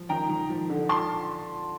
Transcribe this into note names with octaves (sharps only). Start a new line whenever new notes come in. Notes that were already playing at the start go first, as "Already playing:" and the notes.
Already playing: F3
D#3 G5 A#5
D#3
F3
D3
A5 C6